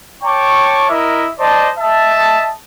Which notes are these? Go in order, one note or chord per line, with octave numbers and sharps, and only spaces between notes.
C#5 G5 A5 C#6 D6
E4 A#4 D#5 E5
C5 D5 D#5 A5
D#5 E5 A5